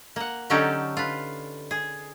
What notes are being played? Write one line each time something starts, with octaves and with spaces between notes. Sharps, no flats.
A#3 F#5
D3 F#3 C#4 D#4 G4 A4
F4 B4
G#4